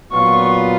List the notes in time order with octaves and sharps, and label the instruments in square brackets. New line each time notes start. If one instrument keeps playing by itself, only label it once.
[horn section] A#2 F#3 B3 F4 [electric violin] C#6